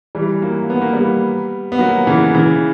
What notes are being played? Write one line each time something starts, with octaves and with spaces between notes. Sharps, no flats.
E3 G3
F#3 A#3
B3
A#3
G3 B3
B3
F#3 A#3
C#3 E3
C#3 E3